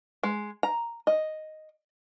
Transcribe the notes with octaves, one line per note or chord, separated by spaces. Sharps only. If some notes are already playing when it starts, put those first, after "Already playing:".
G#3
A#5
D#5